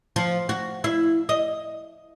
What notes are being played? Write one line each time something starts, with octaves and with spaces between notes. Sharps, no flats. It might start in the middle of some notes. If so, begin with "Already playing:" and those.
F3
F#4
E4
D#5